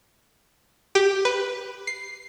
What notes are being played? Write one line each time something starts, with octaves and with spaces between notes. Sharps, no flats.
G4
B4
C7